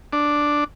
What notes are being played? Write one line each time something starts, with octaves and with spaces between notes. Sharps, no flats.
D4